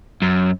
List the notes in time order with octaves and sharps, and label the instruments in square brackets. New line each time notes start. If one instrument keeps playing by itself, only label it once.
[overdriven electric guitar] F#2